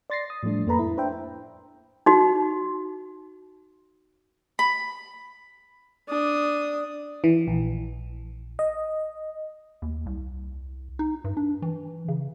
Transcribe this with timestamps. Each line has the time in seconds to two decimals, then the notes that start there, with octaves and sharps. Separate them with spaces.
0.10 D5 C6 A6 A#6 C7
0.30 D#6
0.43 A2 F3 G3 A3 D4
0.66 F2 A#3 A4 B4 A#5 B5
0.79 E4
0.97 D4 B4 C5 E5 G5
2.06 D#4 F#4
4.59 B5
6.08 D4 D#6
7.24 E3
7.48 A#1
8.59 D#5
9.82 D#2
10.06 C2
10.99 D#4
11.24 G2
11.37 D4
11.62 E3
12.08 C#3